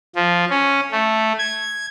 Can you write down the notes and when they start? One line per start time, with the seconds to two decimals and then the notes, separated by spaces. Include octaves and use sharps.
0.16 F3
0.50 C#4
0.91 A3
1.39 G#6